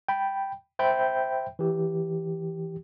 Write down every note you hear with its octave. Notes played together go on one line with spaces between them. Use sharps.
G5 B5
C5 E5 G5 B5 G6
E3 G4